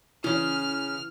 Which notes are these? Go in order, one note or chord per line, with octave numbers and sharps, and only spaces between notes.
C#3 E3 C#4 F6